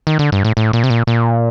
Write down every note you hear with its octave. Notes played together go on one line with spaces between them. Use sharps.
D#3
D3
G2
A2
A2
A#2
C3
A#2
A#2